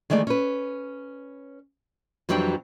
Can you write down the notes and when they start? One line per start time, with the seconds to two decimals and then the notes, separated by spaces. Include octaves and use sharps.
0.10 D#3 E3 G#3 A3 D5
0.27 C#4 B4
2.29 F2 E3 F#3 G3 D4 G5